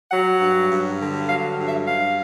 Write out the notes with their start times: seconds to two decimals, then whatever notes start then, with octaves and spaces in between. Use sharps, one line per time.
0.11 F#3 F#5
0.41 G2
0.70 G2
1.00 D3
1.29 F#3 F5
1.58 G2
1.68 E5
1.87 G2 F5